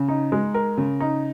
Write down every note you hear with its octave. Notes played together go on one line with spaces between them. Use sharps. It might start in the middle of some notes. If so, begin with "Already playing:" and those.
Already playing: C#3
D#4
G#3
A#4
C#3
D#4